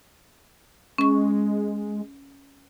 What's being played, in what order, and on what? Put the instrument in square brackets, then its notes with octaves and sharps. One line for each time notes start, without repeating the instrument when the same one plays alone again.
[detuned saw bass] G#3 [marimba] C#4 C#6